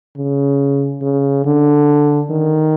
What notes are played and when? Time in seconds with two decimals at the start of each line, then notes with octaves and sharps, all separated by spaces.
0.16 C#3
1.02 C#3
1.45 D3
2.31 D#3